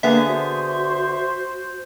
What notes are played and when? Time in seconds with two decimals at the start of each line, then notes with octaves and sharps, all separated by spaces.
0.03 D3 A#3 B3 G#4 E5
0.27 F#4 C5